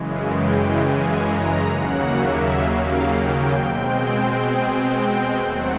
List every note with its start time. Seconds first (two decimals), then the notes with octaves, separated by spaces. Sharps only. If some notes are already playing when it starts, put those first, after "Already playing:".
Already playing: F#2 C#3 E3 G#3
0.25 G5
0.72 G#5
1.19 A#5
1.66 D#2 C#3 F#3 A#3 F#5
2.13 E5
2.60 F5
3.06 G5
3.54 B2 G#3 C4
4.48 G5
5.41 D#2 D#3 F#3 A3 C4 F#5